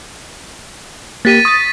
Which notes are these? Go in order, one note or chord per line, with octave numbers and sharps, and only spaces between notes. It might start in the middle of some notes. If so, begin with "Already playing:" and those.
A#3 G4 A6 B6 D#7
C#6 D#6 A6